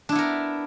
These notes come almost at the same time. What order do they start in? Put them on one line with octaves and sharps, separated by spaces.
D4 E4 B3 A#4